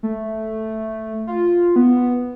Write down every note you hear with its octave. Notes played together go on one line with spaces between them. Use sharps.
A3
F4
B3